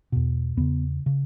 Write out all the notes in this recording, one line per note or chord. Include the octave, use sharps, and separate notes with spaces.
E2 B2
E2 C#3 B3
C#3